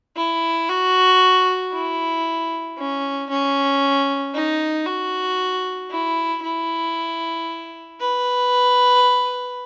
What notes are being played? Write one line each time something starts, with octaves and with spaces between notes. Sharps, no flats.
E4
F#4
E4
C#4
C#4
D#4
F#4
E4
E4
B4